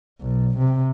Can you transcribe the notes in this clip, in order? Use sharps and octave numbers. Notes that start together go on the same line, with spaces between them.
B1
C3